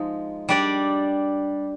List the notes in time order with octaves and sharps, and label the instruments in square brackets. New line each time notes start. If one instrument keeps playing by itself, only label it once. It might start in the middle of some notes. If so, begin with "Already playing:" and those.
Already playing: [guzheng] F3 G#3 D#4
G3 D4 G4 D5